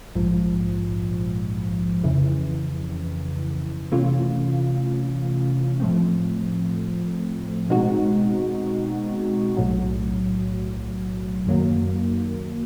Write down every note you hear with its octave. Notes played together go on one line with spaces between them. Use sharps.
A#1 G#2 F3
F2 C#3 E3
C3 E3 A3 C#4 F4
A2 F3 A3 C4
B2 G#3 C4 D#4 F#4
B1 A2 F#3
F#2 D#3 F#3 A#3